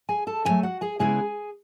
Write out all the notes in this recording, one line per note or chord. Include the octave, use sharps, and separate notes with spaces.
G#4 G#5
A4 A5
E2 D#3 F#3 A3 G#4 G#5
F#4 F#5
G#4 G#5
C#3 G#3 B3 E4 G#4 G#5